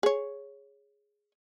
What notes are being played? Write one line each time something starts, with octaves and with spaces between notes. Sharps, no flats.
G#4 C#5